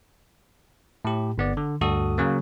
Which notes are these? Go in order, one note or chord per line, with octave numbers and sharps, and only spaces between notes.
A2 G4
G1 B3 D5
D3
D2 G2 F#4 A4 D#6
C#3 F#3 A#3